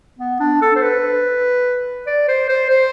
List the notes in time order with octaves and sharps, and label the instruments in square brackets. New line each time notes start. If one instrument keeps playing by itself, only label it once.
[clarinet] B3
D4
A4
C5
B4
D5
C5
C5
C5